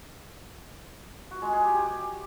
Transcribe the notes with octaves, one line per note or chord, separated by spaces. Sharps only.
F#4
G#3
G#4
G4
G4